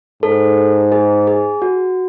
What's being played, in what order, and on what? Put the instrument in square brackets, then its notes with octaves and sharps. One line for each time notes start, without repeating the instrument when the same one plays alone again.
[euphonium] G#2 [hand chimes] A4
[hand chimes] G#4
G#4
F#4